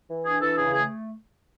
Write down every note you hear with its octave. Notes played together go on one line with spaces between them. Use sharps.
E3
D4 G#4
E3 A4
C#3 G#4
A3 G#4